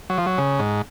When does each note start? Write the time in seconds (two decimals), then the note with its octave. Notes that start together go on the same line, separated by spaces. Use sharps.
0.10 F#3
0.18 F3
0.26 F#3
0.38 C#3
0.59 G#2